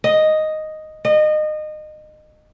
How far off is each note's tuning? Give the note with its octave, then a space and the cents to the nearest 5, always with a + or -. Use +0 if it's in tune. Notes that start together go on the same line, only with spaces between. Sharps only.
D#5 +0
D#5 -25